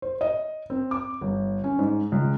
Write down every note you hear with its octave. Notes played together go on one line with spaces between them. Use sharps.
C5
D#5
C4
D6
G1
C#4
G#2
C#2